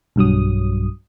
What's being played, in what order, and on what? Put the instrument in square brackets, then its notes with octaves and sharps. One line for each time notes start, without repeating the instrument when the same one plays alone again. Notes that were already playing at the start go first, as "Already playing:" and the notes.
[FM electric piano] B1 G2 F#3 D#6